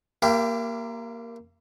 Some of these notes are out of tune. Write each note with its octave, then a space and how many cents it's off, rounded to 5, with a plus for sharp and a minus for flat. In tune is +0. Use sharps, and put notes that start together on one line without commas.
A#3 +0 E4 +45 G4 +0